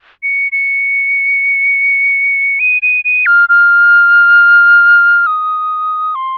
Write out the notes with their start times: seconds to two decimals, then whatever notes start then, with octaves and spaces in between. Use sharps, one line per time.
0.23 C#7
0.52 C#7
2.60 D#7
2.82 D#7
3.05 D#7
3.26 F6
3.49 F6
5.27 D#6
6.15 C6